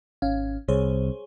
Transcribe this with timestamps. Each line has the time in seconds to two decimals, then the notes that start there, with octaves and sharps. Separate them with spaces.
0.22 G#1 C#4 F5
0.68 C2 G#4 C5 C#5